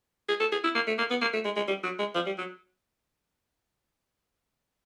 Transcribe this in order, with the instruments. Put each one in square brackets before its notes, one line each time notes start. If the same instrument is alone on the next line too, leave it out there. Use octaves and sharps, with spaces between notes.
[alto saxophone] G#4
A4
G#4
E4
A#3
A3
A#3
B3
A#3
A3
G#3
G#3
G3
F#3
G#3
F3
G3
F#3